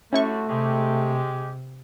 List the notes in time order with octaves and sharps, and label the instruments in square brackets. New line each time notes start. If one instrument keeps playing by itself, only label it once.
[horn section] D3 G3 F#4 [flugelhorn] A3 [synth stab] C#4 E4 C#6
[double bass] C3 [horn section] G#3 G4